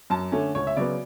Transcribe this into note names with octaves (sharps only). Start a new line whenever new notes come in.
F#2 A5
D3 A3 C#4
C#2 C#5
E5
C#3 F#3 B3 D5